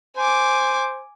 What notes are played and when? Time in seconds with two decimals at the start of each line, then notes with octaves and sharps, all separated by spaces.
0.17 C5 G#5 D6